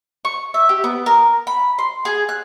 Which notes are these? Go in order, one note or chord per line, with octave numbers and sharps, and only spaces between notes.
C#6
E5
G4
B3
A#4
B5
C6
G#4
F#6